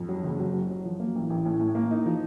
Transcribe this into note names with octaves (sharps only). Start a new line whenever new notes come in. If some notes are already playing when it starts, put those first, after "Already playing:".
Already playing: F2
F#3
F#1
F#3
F#3
F#3
F3
A#3
A1
A1
A2
A2
A#3
D#4
F3